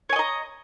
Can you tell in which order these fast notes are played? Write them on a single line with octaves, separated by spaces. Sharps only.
C#5 G#5 D#5 A#5